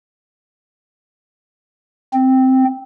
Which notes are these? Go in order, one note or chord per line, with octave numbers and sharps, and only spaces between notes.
C4